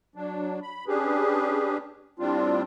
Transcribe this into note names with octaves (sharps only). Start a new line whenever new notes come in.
F#3 D4
B5
C#4 D4 G4 G#4 B4
A2 G3 C4 D4 F4